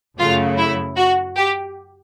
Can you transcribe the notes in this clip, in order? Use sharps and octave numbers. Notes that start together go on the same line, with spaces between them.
F#2 C#3 F#3 A3 F4
E4
F#4
G4